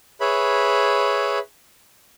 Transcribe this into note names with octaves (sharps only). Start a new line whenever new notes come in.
G#4 B4 C#5 E5 B5